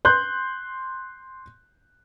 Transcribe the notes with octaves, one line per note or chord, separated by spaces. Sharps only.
C6 F#6 G6